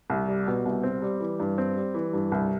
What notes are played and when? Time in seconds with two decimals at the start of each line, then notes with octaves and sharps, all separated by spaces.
0.10 C2
0.28 G3
0.47 B2
0.65 C2
0.83 C4
1.02 G3
1.20 E3
1.40 G2
1.58 C4
1.77 G3
1.94 E3
2.13 G2
2.32 C2